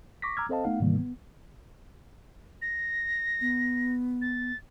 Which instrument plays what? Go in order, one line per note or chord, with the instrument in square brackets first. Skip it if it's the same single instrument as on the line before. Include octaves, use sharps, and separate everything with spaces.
[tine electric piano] C#6 D6 A#6 B6
A#5 D6 E6 F6 G#6
C4 A4 C5 D#5 F5 A5
A3 B3 D#4 F5 F#5
G#2 C3 D#3 E3 G3 A#3
B3
[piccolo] A#6
[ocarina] B3
[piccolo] A6